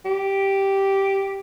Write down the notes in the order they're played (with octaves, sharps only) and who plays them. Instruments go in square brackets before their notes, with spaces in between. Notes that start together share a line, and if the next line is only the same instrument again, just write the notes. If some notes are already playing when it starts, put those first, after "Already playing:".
[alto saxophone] G4